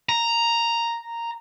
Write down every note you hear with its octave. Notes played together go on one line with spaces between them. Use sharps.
A#5